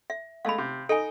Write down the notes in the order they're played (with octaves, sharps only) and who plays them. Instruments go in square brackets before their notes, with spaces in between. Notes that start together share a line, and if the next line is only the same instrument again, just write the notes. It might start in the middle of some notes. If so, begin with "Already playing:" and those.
[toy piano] E5
[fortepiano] G#3 A3 [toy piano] F5 B5
[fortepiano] C3
[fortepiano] D#4 [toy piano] A4 G#5